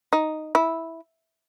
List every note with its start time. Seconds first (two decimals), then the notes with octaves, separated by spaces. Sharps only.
0.13 D#4
0.55 E4